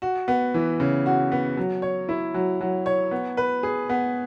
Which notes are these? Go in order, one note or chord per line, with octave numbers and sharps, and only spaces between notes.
F#4
B3
E3
C#3
F#4
B3
F#3
C#5
E4
F#3
F#3
C#5
B3
B4
G#4
B3